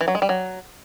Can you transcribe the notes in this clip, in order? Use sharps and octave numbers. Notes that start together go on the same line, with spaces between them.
E3
F#3
G#3
G3
F#3